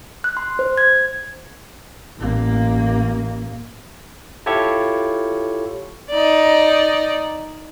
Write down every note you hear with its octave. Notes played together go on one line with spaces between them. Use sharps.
F#6
C6
C5
G#6
A1 A#3
E4 F4 G4 A4 C#5 C#6
D#4 D5